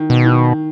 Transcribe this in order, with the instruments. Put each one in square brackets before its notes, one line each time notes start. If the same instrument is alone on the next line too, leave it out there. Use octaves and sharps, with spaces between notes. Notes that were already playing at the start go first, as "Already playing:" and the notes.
Already playing: [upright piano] D#3
[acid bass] B2
[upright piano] D#3